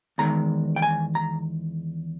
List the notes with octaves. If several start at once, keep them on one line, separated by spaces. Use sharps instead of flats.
E2 D#3 G#3 A#5
G5
G#5
A#5